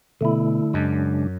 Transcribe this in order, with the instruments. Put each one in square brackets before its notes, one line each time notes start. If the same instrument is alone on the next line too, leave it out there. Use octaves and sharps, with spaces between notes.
[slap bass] B2 [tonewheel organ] D3 A3 E4
[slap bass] F#2 [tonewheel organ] C#3 G#3 D4